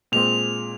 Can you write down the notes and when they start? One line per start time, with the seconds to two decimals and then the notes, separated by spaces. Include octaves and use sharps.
0.12 A#2 G#3 C4 F7